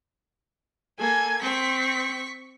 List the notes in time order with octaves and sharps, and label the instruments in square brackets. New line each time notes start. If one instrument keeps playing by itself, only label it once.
[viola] A#3 A4 [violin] G#5 G#6
[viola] C4 [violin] C#6 B6